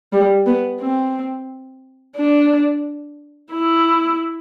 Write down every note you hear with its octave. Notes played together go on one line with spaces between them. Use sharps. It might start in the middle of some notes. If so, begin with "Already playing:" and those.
G3
B3
C4
D4
E4